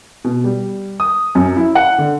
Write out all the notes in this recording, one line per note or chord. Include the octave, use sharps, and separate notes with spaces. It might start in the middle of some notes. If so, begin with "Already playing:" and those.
B2
G3
D#6
F#2
E4
F#5
D3